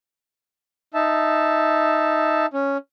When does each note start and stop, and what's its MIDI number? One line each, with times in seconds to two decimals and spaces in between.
0.94 2.46 63
0.94 2.46 76
0.94 2.46 81
2.53 2.77 61